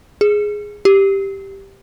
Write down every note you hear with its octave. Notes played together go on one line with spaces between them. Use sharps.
G#4
G4